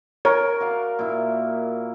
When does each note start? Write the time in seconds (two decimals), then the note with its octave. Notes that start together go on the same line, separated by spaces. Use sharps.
0.25 A#4 C#5
0.60 F#4 D5 F5
0.99 A#2 E4